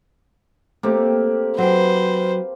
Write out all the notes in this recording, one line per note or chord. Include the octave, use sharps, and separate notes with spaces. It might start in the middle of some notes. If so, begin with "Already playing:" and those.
A3 A#3 C4 G4
F#3 B4 C5 G5